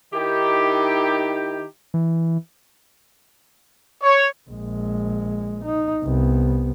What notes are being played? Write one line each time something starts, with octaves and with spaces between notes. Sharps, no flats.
D#3 D#4 E4 G4
E3
C#5
A#1 G#3
D#4
C2 B3